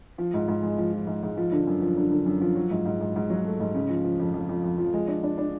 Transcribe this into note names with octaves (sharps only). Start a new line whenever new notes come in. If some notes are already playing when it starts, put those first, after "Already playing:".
F3
G#2
G#2
G#3
F3
F3
G#2
G#2
F3
D3
F#2
F3
D3
D3
F#2
F3
F#3
G#2
G#2
G#2
G#2
F#3
A3
G#2
C#3
F3
F3
F2
F2
F2
F2
F3
G#3
D4
D4
D4